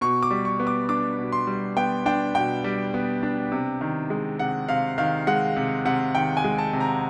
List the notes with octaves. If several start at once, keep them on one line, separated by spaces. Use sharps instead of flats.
B2 C#6
D6
G3
C#6
B3
D6
D4 D6
B2
C6
G3
B3 G5
D4 G5
B2 G5
G3
B3
D4
C3
D#3
G#3
C3 F#5
C3 F5
D#3 F5
G#3 F#5
C3
C3 F#5
D#3 G5
G#5
G#3
A5
C3
A#5